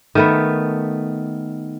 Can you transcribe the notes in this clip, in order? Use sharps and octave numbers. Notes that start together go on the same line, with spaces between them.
D#3 A3 B3